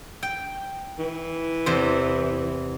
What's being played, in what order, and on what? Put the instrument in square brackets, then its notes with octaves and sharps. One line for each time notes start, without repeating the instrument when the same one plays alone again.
[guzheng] G5
[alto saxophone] E3
[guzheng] E2 C3 C5